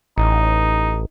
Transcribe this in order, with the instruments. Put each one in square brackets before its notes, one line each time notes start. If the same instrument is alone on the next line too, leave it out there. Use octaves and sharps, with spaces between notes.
[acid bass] A1 [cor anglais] D#4